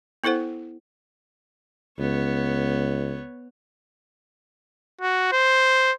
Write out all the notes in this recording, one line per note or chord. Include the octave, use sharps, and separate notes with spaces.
B3 E4 A4 C5 F#5
C#2 B3 C#5
F#4
C5